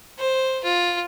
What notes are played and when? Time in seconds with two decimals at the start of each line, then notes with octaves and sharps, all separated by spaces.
0.19 C5
0.64 F4